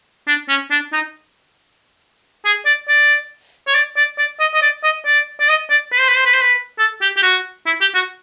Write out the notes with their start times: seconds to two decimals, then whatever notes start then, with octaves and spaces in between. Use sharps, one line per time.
0.27 D4
0.49 C#4
0.71 D4
0.93 D#4
2.45 G#4
2.66 D5
2.89 D5
3.67 C#5
3.75 D5
3.97 D5
4.18 D5
4.40 D#5
4.54 D#5
4.62 D5
4.84 D#5
5.06 D5
5.40 D5
5.49 D#5
5.70 D5
5.93 B4
6.00 C5
6.09 B4
6.17 C5
6.26 B4
6.34 C5
6.42 B4
6.79 A4
7.02 G4
7.17 G4
7.23 F#4
7.66 E4
7.81 G4
7.95 F#4